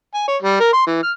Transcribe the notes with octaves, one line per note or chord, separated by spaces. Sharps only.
G#5
C#5
G3
A#4
C6
E3
F6